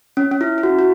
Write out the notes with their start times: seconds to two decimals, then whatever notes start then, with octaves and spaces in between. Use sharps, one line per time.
0.17 C#4
0.31 C#4
0.41 E4
0.58 E4
0.63 F#4
0.79 F#4